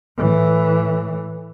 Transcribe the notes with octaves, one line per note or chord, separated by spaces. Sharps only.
A2 E3